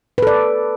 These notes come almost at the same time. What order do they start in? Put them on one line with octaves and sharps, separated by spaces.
B4 A4 D5